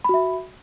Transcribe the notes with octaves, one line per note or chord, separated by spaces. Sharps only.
F#4 E5 B5